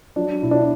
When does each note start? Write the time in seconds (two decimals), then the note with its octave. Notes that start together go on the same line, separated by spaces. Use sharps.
0.16 F#3 D4
0.42 B2 E4
0.51 D4